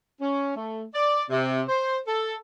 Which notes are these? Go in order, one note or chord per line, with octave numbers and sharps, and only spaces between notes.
C#4
A3
D5
C3
C5
A4